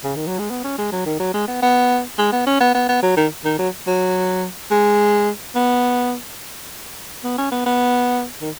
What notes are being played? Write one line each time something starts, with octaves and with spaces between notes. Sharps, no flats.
C#3
D#3
F#3
G#3
B3
C#4
G#3
F#3
D#3
F#3
G#3
B3
B3
G#3
B3
C#4
B3
B3
B3
F#3
D#3
D#3
F#3
F#3
G#3
B3
B3
C#4
B3
B3
D#3